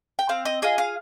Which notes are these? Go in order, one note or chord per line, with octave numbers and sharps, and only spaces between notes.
G5
C4 F5
D#5
F4 G#4 D#5
F5